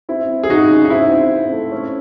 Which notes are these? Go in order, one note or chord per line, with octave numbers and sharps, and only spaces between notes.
C4 E4
C4
G#4
C#3 D#4 F#4
C#3
D#4
C4 E4
C4
C4
A3
C#4